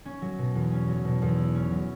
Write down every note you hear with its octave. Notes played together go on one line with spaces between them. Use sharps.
C#4
F#3
B2
E2
C#4
F#3
B2
E2
E4
C#4
F#3